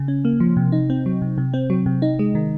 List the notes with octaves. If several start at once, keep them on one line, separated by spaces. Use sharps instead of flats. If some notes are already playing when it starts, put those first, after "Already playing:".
Already playing: C#3
C#4
A#3
F3
C3
D#4
C4
F#3
C3
C3
C4
F#3
C3
D#4
G#3
D#3